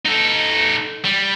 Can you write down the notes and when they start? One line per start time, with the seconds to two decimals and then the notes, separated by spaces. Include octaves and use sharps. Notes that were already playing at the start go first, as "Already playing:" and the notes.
0.06 D#4 A4
1.05 G3